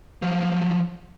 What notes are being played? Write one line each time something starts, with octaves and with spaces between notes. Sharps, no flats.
F3 F#3